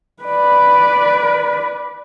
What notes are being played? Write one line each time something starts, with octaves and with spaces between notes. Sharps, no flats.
B4 D5